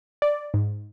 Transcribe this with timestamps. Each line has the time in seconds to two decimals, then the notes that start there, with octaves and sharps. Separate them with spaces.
0.22 D5
0.54 G#2